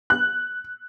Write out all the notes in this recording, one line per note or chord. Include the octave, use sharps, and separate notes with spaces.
F#6